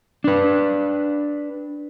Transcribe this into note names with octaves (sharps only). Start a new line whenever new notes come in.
D4 B4